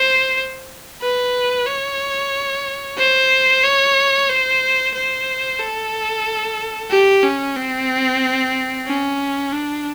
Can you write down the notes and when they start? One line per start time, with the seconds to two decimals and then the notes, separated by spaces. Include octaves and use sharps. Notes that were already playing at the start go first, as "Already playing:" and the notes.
Already playing: C5
1.02 B4
1.66 C#5
2.98 C5
3.63 C#5
4.29 C5
4.95 C5
5.60 A4
6.91 G4
7.23 C#4
7.56 C4
8.87 C#4
9.53 D4